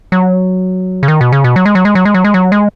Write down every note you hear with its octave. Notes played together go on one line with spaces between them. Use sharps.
F#3
C#3
D#3
B2
C#3
B2
F#3
G#3
F#3
G#3
F#3
G#3
F#3
G#3
F#3
G#3